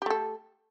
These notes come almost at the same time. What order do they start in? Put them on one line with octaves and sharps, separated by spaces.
G4 A3 A4